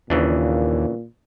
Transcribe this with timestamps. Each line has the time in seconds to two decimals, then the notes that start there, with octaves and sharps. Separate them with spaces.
0.10 D#2 A#2 C#3 E3 D4